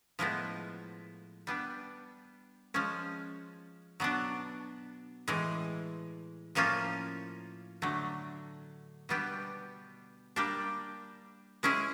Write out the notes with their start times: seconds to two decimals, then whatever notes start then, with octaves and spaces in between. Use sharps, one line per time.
0.19 A2 F3 G#3 B3 E4
1.47 G3 B3 D4
2.74 F3 G#3 C#4
4.00 B2 F#3 B3 D4
5.28 A2 E3 G#3
6.55 A2 F3 A#3 C#4 F4
7.82 D3 F#3 A3
9.09 B2 G3 B3 D4 G4
10.36 G3 A#3 D4 G4
11.63 G#3 C#4 E4 G#4